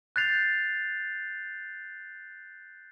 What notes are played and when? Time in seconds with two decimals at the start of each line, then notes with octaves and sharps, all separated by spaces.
0.16 F#6 G6 A6 C7 F7